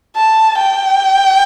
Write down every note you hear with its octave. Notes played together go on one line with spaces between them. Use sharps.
A5
G5